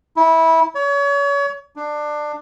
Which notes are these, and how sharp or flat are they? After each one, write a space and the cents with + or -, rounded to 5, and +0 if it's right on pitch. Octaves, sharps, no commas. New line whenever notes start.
E4 -20
C#5 +35
D4 +20